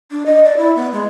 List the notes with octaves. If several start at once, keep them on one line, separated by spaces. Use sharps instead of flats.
D4
D#5
D5
E4
B3
G#3